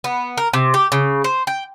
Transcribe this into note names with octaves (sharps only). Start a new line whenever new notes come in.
B3
A#4
C3
G4
C#3
C5
G5